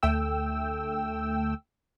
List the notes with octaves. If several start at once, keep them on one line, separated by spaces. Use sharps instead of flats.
D2 A3 G5 E6